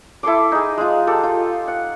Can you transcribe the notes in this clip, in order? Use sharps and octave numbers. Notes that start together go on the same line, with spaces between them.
E4 A4 C6 D6
D#4 G#4
G#3 F4
G4 A4
F4
F#5